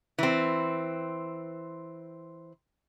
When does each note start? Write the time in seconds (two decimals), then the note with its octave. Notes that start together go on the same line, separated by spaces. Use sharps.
0.18 E3 C4